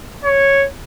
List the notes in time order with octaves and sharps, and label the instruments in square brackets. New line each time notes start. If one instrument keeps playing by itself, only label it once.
[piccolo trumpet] C#5